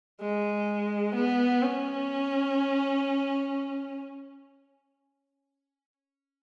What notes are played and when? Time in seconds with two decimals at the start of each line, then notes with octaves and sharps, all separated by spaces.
0.21 G#3
1.15 B3
1.63 C#4